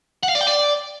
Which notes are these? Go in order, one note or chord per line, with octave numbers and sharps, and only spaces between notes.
F#5
F5
D5
G5
D5